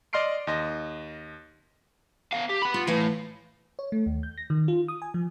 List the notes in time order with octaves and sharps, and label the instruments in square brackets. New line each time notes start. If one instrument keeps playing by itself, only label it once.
[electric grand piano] D5 D#5 C6 F6 C7 D7
D#2 D#5 C6 A#6
[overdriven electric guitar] B3 F5
G4
F#5 B5
[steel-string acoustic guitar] F4
[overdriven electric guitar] A2 [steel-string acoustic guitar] E3 F5
[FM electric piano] C#5
A3
D#2
G6
A#6
D#3
F4
D#6
G#5
F3